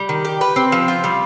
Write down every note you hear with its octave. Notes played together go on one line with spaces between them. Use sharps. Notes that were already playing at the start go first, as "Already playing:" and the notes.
Already playing: G3
D#3
G4
B4
C4
F3
F4
G3